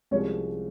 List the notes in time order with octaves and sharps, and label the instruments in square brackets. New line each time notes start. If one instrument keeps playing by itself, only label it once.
[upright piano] C2 C3 F3 G#3 C#4 C#5